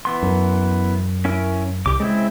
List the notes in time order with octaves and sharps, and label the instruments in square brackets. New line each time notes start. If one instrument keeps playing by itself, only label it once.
[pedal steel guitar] E3 B3 C6
[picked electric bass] F#2
[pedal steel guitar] C#4 E4 A#4
[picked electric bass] C2 [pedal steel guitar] G4 D6
[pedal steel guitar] C#3 C4 E4 [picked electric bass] G#3